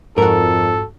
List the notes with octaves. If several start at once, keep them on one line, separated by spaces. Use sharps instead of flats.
F2 G#2 F#4 A4 A#4